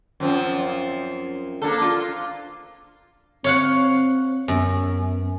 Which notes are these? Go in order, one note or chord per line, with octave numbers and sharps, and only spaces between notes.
F#2 F3 C4
A#3 D4 A4
F4
C4 C#5 F5 F#5
F#2 B3